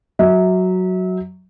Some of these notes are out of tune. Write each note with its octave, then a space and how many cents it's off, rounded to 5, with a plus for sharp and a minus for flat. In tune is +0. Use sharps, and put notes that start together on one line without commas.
F#3 +0 E5 -30